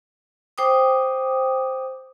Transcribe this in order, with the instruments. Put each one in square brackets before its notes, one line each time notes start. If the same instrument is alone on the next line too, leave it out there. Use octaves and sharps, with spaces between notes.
[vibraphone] C5 G5 D6 D#6